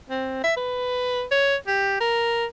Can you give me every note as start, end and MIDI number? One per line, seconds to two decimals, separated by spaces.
0.10 0.41 60
0.44 0.53 76
0.57 1.24 71
1.31 1.56 73
1.68 1.98 67
2.00 2.45 70